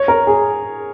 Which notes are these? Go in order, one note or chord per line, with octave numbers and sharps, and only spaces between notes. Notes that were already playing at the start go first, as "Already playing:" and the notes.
Already playing: C#5
A#4
G#4